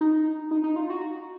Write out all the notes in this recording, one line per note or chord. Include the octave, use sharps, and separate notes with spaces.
D#4
D#4
D#4
F4
F#4